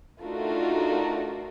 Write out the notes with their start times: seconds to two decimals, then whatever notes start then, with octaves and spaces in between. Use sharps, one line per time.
0.23 A3 D4 D#4 F4 F#4 A#4